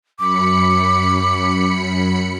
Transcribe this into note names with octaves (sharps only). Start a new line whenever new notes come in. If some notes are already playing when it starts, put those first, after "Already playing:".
F#2 B5 D6 C#7